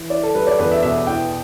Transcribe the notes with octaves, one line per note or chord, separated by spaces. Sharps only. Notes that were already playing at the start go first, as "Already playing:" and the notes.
Already playing: E3
E4 D5
A4
G3 B4
D5
E2 B4
E5
B2 E5
E4 G5